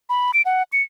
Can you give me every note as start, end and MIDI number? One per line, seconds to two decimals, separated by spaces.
0.09 0.31 83
0.34 0.42 98
0.45 0.63 78
0.73 0.82 97